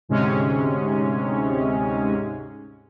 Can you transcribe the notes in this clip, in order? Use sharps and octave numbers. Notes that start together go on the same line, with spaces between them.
D2 G#2 C3 G#3 C#4